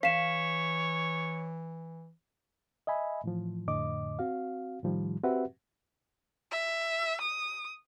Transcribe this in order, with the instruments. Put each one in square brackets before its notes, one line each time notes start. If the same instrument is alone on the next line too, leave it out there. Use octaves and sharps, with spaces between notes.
[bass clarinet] E3 [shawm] C#5 [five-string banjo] F5 [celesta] B6 E7
[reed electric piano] D#5 E5 G#5 B5
A2 E3 F3
F2 A2 D3 D#5 D6
C4 F#4 F5
A2 D#3 F3 G3
C4 F#4 G4 B4 E5 F#5
[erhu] E5
D#6